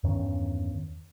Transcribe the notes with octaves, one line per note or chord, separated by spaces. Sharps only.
E2 G2 D#3 C#4